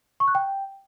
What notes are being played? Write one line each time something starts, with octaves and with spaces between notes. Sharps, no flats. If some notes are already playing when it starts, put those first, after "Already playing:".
C#6
F#6
G5